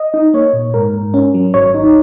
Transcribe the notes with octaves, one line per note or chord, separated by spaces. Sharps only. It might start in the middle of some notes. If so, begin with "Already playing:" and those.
Already playing: D#5
D#4
A#3 C#5
A#2
G#2 A#4
G#2
C#4
F#3
G#1 C#5
D#4